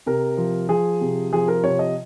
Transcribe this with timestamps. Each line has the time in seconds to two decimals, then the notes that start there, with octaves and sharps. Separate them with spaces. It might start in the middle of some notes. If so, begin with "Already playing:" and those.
0.06 C3 A#4
0.37 F3
0.69 F3 G#4
1.01 C3
1.32 F3 G#4
1.48 A#4
1.64 C3 C#5
1.79 D#5